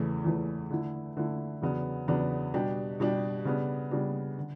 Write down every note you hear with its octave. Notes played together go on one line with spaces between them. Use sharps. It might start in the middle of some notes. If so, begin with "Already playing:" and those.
Already playing: E2 C#3 E3 A3
E2 C#3 E3 A3
D3 A3 E4
D3 A3 E4
E2 C#3 F#3 B3 D4
E2 C#3 F#3 B3 D4
B2 G3 D4 G4
B2 G3 D4 G4
C#3 G3 B3 D4
C#3 G3 B3 D4
D3